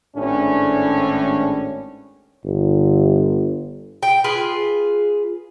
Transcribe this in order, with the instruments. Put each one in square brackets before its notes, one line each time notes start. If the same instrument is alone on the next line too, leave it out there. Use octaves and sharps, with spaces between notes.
[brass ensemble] G#1 A2 C#4 D4
[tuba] G1
[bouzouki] G5
F4 G#4 B4